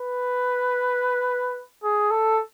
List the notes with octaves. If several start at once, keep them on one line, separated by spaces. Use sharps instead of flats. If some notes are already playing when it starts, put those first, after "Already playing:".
Already playing: B4
G#4
A4